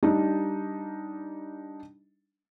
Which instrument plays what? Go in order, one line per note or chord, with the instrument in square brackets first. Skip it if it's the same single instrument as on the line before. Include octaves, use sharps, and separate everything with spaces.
[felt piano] G3 D4 D#4